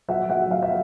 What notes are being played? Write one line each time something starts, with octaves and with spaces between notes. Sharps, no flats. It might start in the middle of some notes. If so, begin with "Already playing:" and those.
F#3 E5 F#5
F#3 E5 F#5
F#3 F5
E5